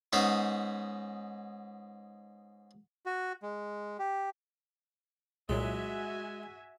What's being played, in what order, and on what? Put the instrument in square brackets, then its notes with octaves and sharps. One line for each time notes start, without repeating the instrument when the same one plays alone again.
[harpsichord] G#2 B3 C#4 D#4 G#4 E5
[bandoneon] F#4
G#3
G4
[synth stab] C2 A#2 F#3 [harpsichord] G#3 [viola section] F#4 E5 G#5